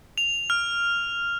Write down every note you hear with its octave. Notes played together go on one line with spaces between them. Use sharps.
F7
F6